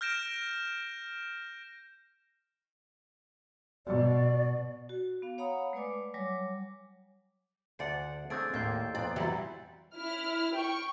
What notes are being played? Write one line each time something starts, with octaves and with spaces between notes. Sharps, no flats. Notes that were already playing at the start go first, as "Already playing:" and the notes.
F6 G6 A#6 D7 E7
B2 D5
F#4
B3 F5
C#5 F5 F#5 A#5 B5 D#6
G#3 A3 B4 D5 G#5 D6
F#3 G3 C#5 G#5 D6
D2 C5 D5 F#5 A5
A3 C4 D4 G#4 E6 A6 D7
D#2 A2 A#3 D5 C6 G6 C7
F2 A#2 B3 D5
E3 F#3 G3 E4
E4 F6
G5 C#6